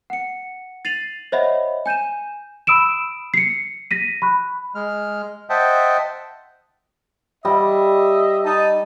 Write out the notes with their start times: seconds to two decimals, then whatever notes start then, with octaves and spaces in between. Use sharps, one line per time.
0.10 F#5 C#7
0.85 A6 C7 D#7 F7 F#7
1.32 C5 C#5 D#5 E5 F#5 B5
1.86 G#5 G6 D#7 E7
2.67 B5 D#6 E6 D7 E7
3.34 C7 C#7
3.91 A#6 B6 D#7
4.22 B5 C#6 F#6
4.75 G#3 F6
5.50 C5 D#5 E5 F#5 G5 A5
7.45 G3 D#5 E5
8.45 D#4 A5